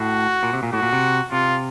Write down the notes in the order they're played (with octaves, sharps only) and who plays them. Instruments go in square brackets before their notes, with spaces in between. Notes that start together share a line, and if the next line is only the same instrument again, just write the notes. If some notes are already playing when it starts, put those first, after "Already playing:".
Already playing: [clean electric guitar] A2 [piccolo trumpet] F#4
[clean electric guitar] A#2
C3
A#2
[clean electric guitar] A2 [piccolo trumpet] F#4
[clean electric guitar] A#2
C3
[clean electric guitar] C3 [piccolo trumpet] F4